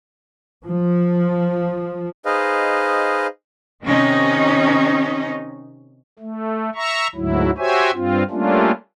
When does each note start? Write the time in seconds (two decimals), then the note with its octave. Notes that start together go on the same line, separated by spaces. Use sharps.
0.68 F3
2.26 D#4 G#4 B4 C5 D#5 F5
3.83 C3 D#3 C#4 D#4
6.19 A3
6.75 E5 A#5 C#6
7.15 D2 G#2 F#3 E4
7.58 F#4 G4 C5 C#5 E5 G#5
7.93 G2 C4 F4
8.30 G3 A3 A#3 C#4 D4 F4